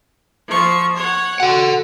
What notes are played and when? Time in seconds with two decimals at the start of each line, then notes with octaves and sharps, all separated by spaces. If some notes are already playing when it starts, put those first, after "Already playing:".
0.48 F3 C#6
0.96 C#5 F#5
1.40 F#4 A4 F#5